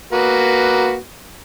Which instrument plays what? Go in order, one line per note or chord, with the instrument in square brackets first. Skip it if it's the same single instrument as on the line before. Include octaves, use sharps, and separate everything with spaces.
[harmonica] A#3 F#4 B4